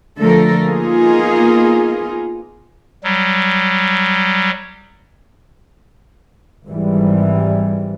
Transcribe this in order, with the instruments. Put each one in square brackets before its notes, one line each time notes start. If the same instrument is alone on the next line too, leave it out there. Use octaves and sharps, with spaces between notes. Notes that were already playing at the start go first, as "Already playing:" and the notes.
[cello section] D3 F3 A3 A4 A#4
A#3 B3 D#4 F4 G#4
[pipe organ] F#3 G3
[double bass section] G#1 G#2 E3 G3